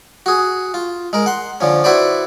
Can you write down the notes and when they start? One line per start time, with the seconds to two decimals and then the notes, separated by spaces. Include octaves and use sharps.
0.26 F#4 G#4
0.74 F4
1.13 G#3 A#4
1.26 F#5 C6
1.61 D3 F3 C#4
1.84 E4 F#4 B4 C5 D5